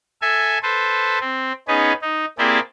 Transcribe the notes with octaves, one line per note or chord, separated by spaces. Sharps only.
A4 E5 G#5
A4 B4 C5
C4
B3 C#4 D#4 G#4 B4
D#4
A#3 C4 E4 G4 G#4 D5